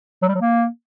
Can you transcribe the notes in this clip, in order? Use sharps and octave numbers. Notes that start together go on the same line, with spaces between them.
F#3
G3
F#3
A#3